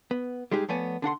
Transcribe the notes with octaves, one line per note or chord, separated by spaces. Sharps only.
B3
G3 G#3 D#4 G4 G#4
F3 A3 B3 C#5 D5 G#5
D3 D4 F#5 C6